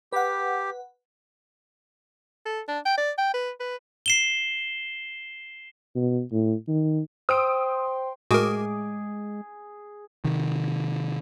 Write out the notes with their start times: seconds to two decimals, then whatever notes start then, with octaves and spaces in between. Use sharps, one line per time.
0.13 G4 B4 F#5
2.46 A4
2.68 D4
2.86 G5
2.98 D5
3.18 G5
3.34 B4
3.60 B4
4.06 C7 E7 G7
5.95 B2
6.32 A2
6.68 D#3
7.29 C5 G5 C6 D#6 E6 D7
8.31 A2 G#3 F#4 G#4 A#4 D6 D#6
10.24 C3 D#3